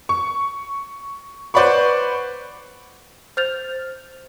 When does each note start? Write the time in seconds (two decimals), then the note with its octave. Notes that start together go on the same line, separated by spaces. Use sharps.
0.09 C#6
1.54 B4 C5 D5 F#5 B5 C#6
3.37 C5 F6 G6 A6 F7